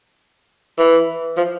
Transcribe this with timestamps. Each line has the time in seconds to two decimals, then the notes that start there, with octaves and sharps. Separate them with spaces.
0.79 E3
1.37 F3